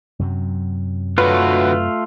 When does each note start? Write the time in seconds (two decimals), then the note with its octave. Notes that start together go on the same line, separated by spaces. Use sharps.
0.19 F#2 C3 F#3
1.18 D3 A3 F4 F#4 B4 C#5